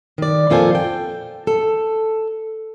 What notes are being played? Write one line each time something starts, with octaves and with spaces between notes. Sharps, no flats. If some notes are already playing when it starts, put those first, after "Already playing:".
D#3 D5
F2 A#2 F4 A4 C5 G#5
G5
A4